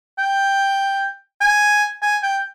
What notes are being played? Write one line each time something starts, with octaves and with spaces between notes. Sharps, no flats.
G5
G#5
G#5
G5